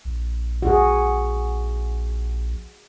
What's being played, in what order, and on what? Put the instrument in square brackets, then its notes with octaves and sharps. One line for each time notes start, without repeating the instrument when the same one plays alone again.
[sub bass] A#1
[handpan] F#4 G#4